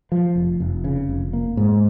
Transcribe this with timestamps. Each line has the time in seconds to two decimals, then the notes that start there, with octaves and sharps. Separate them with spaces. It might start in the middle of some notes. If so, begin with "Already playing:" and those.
0.12 F3
0.36 F1
0.60 F1
0.84 C#3
1.09 F1
1.33 A#3
1.57 G#2